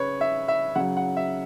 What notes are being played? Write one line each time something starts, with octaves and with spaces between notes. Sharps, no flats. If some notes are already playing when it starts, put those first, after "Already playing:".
Already playing: C#3 B4 C#5
E5
E5
C#3 F#3 F#5
F#5
E5